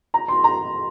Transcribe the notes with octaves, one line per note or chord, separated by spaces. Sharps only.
A#5
C6
A#5